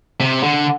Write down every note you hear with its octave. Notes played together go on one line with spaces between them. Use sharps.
C3
D3